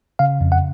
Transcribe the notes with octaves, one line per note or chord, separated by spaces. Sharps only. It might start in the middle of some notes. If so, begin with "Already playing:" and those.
C#3 F5
F2
F#5